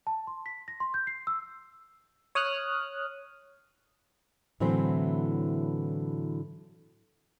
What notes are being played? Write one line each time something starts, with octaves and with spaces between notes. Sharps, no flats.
A5
C6
B6
A#6
C6
G6
C7
E6
C#5 D#6 F6 F#6
A2 D3 E3 F#3 C4 C5